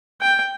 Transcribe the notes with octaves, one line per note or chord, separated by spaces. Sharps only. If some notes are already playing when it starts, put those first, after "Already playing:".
G5